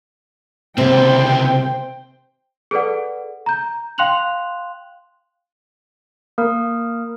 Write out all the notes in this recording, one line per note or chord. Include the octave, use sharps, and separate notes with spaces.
C#2 C3 A#3 C4 C5 G5
G#4 A4 B4 D5 F#5
A#5 G6
F5 G5 C6 F#6 F7 F#7
A#3 A#4